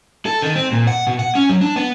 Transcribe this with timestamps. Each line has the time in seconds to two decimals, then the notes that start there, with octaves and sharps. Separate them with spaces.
0.26 A4
0.42 D#3
0.55 C4
0.72 A#2
0.87 F#5
1.07 B2
1.19 F#5
1.35 C#4
1.49 F#3
1.61 D4
1.76 B3